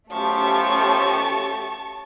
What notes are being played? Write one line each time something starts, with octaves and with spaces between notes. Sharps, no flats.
F#2 B2 F3 A3 C#4 G4 A5 C#6